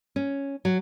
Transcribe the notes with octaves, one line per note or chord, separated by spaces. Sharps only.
C#4
F#3